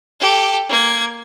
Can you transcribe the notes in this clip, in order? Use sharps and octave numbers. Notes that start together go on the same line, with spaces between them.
G4 A4
A#3 G#6